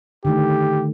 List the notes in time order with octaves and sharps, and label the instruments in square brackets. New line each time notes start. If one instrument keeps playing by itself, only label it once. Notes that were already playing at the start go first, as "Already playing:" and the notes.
[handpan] D3 D#3 A3 [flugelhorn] G4